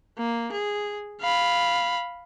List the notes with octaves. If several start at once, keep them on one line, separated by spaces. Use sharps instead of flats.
A#3
G#4
F5 B5